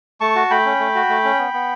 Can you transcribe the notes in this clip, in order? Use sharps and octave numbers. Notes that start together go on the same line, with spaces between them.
A3 A5 C#6
F#4
A3 G5 B5
C#4
A3
F#4
A3
C#4
B3
B3